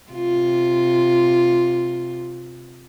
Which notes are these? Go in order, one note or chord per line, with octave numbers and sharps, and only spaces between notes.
C3 F4